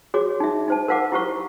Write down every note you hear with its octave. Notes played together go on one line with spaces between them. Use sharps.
F#4 G#4 C#5 D6
D#4 E5
D#4 C5 A5
A#4 C5 F5 F#5 D6
E4 G4 C5 C#6